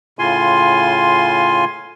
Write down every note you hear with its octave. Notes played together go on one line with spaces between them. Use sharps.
A2 C#3 F4 G#5 C6